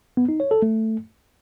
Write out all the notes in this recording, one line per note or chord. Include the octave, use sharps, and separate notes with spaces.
B3
D#4
C#5
A4
A3